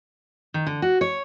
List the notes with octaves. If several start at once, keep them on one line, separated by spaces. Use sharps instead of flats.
D#3
D3
F#4
C#5